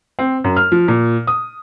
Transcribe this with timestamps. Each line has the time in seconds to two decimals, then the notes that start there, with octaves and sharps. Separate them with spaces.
0.19 C4
0.44 F#2
0.56 F6
0.72 F3
0.88 A#2
1.27 D#6